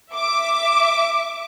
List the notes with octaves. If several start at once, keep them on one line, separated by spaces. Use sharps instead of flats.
E5 D6